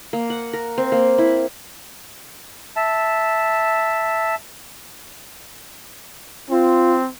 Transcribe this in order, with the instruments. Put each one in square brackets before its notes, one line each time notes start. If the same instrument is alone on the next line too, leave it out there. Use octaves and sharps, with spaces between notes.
[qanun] A#3
F#5
A#4
C4
A#3
E4
[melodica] E5 A5
[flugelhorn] C4 [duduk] F4